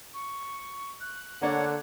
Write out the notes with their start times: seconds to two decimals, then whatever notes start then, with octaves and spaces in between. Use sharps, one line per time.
0.14 C#6
1.01 F#6
1.42 D3 A#3 D4 C#5 F#5